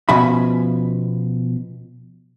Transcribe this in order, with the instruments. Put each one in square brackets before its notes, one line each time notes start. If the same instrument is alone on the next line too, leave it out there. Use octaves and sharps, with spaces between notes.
[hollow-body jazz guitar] B2 F3 C#4 E5 B5